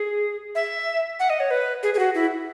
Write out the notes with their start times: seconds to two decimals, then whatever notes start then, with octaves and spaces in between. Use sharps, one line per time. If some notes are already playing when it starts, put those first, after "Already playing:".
Already playing: G#4
0.55 E5
1.20 F#5
1.30 D#5
1.40 C#5
1.51 B4
1.83 G#4
1.94 G#4
1.99 F#4
2.15 E4